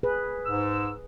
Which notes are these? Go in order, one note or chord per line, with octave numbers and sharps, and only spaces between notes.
G#4 B4
G#2 E6